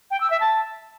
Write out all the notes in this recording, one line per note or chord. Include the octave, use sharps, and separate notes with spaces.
G5
E6
E5
A5